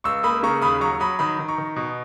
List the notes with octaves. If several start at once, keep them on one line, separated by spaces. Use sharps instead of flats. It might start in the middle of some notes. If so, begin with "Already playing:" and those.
C#2 C#6 E6
A#3 B5 D#6
C#3 A#5 C#6
D#2 B5 D#6
F#3 A#5 C#6
F#3 B5 D#6
D#3 B5 D#6
D#3
A#5 C#6
D#3
B2